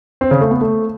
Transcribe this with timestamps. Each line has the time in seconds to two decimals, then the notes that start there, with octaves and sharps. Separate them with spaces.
0.21 C4
0.31 C#3
0.41 A3
0.51 B3
0.61 A3